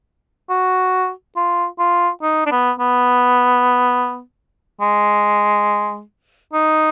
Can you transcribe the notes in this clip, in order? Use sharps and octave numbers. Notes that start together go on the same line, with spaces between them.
F#4
F4
F4
D#4
D4
B3
B3
G#3
D#4